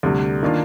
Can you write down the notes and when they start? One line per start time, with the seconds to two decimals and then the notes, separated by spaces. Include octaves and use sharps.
0.03 D2 C3 G3
0.43 D#3 A#3 D4 F4